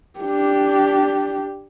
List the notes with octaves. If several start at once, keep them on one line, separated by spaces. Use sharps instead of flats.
D4 G4